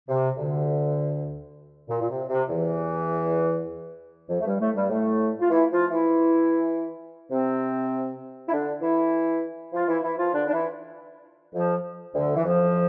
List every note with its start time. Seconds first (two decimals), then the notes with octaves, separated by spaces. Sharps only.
0.08 C3
0.37 D2 D3
1.89 A#2
2.01 A#2
2.09 C3
2.29 C3
2.49 E2 E3
4.29 F2 F3
4.40 A3
4.46 G2 G3
4.60 A2 A3
4.76 G2 G3
4.90 A2 A3
5.40 F4
5.50 E3 E4
5.71 F3 F4
5.91 E3 E4
7.31 C3 C4
8.49 E4
8.53 D3 D4
8.82 E3 E4
9.73 F3 F4
9.88 E3 E4
10.02 E3 E4
10.18 F3 F4
10.33 D3 D4
10.48 D4
10.53 E3 E4
11.54 F2 F3
12.14 D2 D3
12.36 E3
12.44 F2 F3